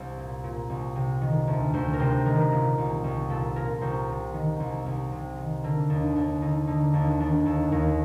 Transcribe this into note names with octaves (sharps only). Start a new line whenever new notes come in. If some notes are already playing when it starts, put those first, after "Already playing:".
Already playing: C2 C5
A#2
A#2
C2
C3
D#3
D2
D2 C5
A#4
C3 C5
D#3 A#4
A#2
C2
C2
A#2 A4
A#2 A#4
C2 C5
C3
D#3
C2
C2
C3
D#3
D3 A#4
D#2 D4
D#2 D4
D3 D#4
D3 D#4
D#2 D4
D#3 D4
D#2 A4
D#2 A#4